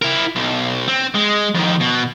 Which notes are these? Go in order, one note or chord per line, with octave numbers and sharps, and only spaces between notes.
E4 A#4
B1
C4
G#3
F2 D#3
B2